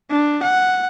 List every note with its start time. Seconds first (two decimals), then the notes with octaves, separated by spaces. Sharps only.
0.10 D4
0.43 F#5